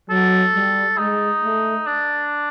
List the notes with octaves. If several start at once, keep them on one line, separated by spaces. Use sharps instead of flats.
F#3 A4
G3
G#3 D#4
A3
D4